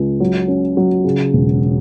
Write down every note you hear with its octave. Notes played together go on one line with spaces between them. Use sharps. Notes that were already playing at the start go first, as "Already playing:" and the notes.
Already playing: C#2
F#3
C#4
F#3
C#3
E1